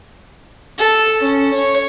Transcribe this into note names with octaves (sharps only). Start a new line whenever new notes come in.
A4
C#4
C#5